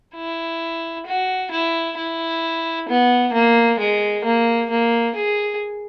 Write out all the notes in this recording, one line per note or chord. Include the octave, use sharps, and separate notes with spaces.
E4
F#4
E4
E4
B3
A#3
G#3
A#3
A#3
G#4